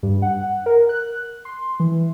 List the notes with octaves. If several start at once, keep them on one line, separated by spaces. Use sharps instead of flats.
G2
F#5
A#4
F#6
C6
E3